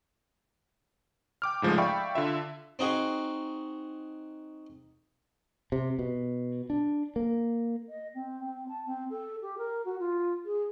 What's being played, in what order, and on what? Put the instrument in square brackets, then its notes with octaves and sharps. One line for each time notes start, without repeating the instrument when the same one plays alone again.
[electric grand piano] G5 D6 F6
G#2 C#3 F3 G#3 A3
D5 E5 F5 G5 B5 C#6
D3 F4 E5
[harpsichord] C4 D#4 F#4 G#4
[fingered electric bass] C3
B2
D4
A#3
[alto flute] D#5
C4
C4
A5
C4
A4
G4
A#4
F#4
F4
G#4